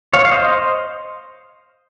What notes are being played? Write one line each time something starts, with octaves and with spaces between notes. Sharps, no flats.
C#5 F5
F5
C5 D#5